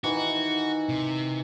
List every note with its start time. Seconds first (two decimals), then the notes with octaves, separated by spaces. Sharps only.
0.04 D#3 E3 F#4
0.89 C3